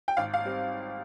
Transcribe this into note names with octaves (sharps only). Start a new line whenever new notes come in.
G5
G#1 F5
F5
G3 C4